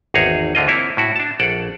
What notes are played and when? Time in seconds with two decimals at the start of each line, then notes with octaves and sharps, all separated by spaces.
0.14 G#1 E2 D#4 G#4 C#5
0.55 D2 D3 F4 D#5
0.68 A#3 C4 E4 C#5
0.97 A2 E4 F#4
1.16 D4 A5
1.39 A#1 A4 D5 F#5